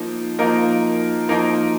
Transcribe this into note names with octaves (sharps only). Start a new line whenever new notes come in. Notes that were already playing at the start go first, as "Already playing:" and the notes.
Already playing: F3 A#3 D#4
F3 A#3 D#4 A#4
F3 A#3 D#4 A#4